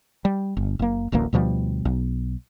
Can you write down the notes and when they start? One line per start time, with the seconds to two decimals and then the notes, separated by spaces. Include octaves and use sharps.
0.25 G3
0.57 G1
0.79 F#1 A#3
1.12 D1 A1 D2 A#3
1.33 D2 B2 F3 G3
1.85 B1